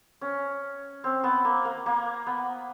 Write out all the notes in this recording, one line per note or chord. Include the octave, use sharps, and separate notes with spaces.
C#4
C4
B3
A#3
A#3
A#3
B3